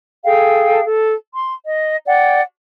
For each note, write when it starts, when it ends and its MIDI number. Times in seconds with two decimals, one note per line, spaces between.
0.25 0.83 68
0.25 0.83 69
0.25 0.83 77
0.25 0.83 79
0.84 1.15 69
1.34 1.54 84
1.65 1.97 75
2.07 2.41 74
2.07 2.41 78
2.07 2.41 79